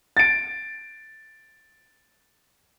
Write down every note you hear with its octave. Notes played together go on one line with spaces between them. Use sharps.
A6 D7